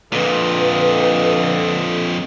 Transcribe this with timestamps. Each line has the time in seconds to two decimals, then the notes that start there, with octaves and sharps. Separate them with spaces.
0.12 F2 A#2 D3 F4 B4 D#5